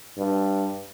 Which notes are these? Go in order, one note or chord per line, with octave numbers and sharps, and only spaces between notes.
G2